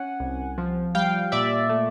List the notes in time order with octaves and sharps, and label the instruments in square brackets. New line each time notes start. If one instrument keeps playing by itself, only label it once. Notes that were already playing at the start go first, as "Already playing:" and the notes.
Already playing: [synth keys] C#4 F#5 G#5
C2
F3
G3 F5 G5
A#2 D5 E5
A3